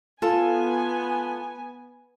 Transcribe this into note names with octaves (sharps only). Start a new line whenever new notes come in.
B3 F4 A4 G#5 A5